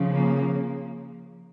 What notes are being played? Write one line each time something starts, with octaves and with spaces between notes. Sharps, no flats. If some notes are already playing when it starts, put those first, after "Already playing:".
Already playing: C#3 F3
A#3